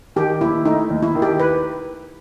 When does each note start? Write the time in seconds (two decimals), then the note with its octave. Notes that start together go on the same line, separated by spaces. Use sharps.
0.16 D#3 G4
0.41 D#2 E4
0.65 A3 D#4
0.90 D#2
1.03 E4
1.15 D#3
1.22 G4
1.40 B4